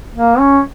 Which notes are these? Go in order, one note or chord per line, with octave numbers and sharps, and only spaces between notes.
A#3
C#4